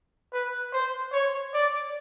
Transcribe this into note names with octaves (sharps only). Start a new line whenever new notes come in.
B4
C5
C#5
D5